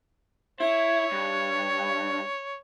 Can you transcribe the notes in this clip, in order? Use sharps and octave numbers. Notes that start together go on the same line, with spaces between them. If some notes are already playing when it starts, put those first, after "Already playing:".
E4 C#5
G2